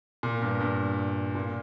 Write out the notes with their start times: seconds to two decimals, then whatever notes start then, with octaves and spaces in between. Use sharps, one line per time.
0.23 A#2
0.42 G2
0.60 G2
1.35 A#2